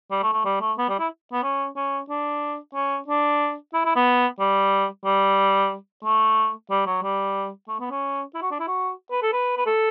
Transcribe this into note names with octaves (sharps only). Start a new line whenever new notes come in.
G3
A3
A3
G3
A3
B3
G3
E4
B3
C#4
C#4
D4
C#4
D4
E4
E4
B3
G3
G3
A3
G3
F#3
G3
A3
B3
C#4
E4
F#4
D4
E4
F#4
B4
A4
B4
B4
A4